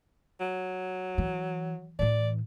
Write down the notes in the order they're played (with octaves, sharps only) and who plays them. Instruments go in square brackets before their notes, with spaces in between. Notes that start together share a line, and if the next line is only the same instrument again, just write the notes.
[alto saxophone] F#3
[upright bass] E3
[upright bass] A2 E3 [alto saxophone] D5